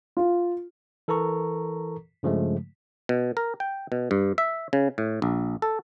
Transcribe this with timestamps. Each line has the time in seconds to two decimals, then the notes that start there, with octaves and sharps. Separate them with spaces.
0.17 F4
1.08 E3 A4 A#4 A#5 C#6
2.23 G2 C#3 F3 G#3 A3
3.09 B2
3.37 A#4
3.60 G5
3.92 B2
4.11 G2
4.38 E5
4.73 C#3
4.98 A2
5.22 A#1
5.62 A4